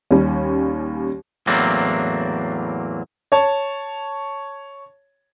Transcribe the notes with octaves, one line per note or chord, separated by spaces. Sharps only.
D#2 D#3 G3 C#4
E2 A2 F#3 A#3 C4 D4
C#5 A5